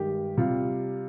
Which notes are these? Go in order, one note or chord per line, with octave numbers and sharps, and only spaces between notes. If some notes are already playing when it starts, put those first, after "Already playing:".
Already playing: G2 D#3 G#3 G4
C3 G3 F4